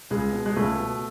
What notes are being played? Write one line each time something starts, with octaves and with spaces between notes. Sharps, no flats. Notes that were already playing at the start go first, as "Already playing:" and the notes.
C#2 G#3
B2
G#3
C#2 A3
B2